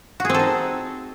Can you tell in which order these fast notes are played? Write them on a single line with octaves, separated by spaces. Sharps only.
F#4 G#4 C4 A4 D#4